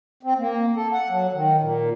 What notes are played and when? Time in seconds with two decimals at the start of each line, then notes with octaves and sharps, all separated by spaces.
0.23 C4
0.39 A#3
0.76 A4
0.93 F#5
1.09 F#3
1.33 D#3
1.61 A#2